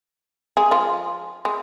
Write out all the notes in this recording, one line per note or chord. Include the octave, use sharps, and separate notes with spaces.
G#3 G#4
F3 F4
G#3